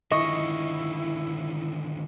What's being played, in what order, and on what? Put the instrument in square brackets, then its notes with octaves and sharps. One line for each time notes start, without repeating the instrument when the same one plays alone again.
[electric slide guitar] D3 D#3 F4 [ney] E4 [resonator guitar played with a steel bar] D#5 [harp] C#6